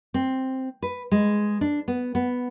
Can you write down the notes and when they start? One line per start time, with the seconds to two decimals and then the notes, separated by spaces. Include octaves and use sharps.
0.14 C4
0.82 B4
1.12 G#3
1.61 D4
1.88 B3
2.15 B3